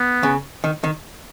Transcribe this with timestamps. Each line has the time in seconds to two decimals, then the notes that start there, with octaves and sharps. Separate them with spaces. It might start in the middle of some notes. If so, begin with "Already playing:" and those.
Already playing: B3
0.23 C#3
0.64 D#3
0.84 D#3